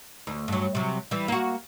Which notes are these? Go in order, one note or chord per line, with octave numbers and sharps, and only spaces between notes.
D2
G2 F#3
C3 F#3
E3 G3
A#3 F#4